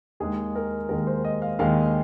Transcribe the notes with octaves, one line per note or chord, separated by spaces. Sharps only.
D#2 D#3 G#3 G#4
A#4
D#2 D#3 G#3 A#4
C5
D#5
F5
D#2 D#3 G#3 F5